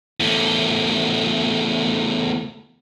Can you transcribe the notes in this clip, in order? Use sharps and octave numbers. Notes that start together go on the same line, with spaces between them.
E2 A3